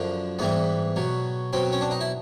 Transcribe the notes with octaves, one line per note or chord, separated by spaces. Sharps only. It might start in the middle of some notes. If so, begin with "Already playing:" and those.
Already playing: F#2 D3 F3
G#2 E3 G3 B3
B2 F#3
B2 F#3 C4
C#4
D4
D#4
E4